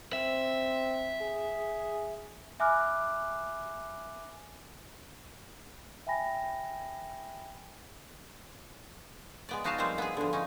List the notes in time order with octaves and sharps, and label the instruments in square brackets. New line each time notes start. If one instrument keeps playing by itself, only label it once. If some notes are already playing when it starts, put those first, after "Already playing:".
[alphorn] C4 [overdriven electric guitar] E5
[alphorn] G#4
[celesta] E5 G#5 B5 D6 F6 F#6
E5 G5 G#5 B5 A#6
[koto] G#3 B3 D5
B3 D#4 F#4 F5 F#5 A5
F3 G3 G#3 A#3 C4 C5
B3 G#4
D3 F3
C#4 D#4